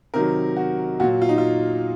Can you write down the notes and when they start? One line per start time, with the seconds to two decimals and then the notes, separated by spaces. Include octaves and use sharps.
0.14 C3 D#3 F#3 A#4
0.57 F#4
1.00 A#2 F#4
1.04 F#3
1.22 F4
1.29 D#4
1.38 F4